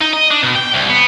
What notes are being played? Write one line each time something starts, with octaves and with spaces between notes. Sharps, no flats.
D#4
D#5
D4
B2
G5
C2
B3